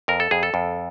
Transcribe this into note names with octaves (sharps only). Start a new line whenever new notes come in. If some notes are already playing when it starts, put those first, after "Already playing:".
F2 A#4
A4
F2 G#4
A4
F2